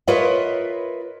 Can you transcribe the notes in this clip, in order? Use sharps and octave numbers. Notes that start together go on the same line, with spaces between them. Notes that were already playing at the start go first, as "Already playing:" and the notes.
F4 A#4 B4 C#5 D#5 E5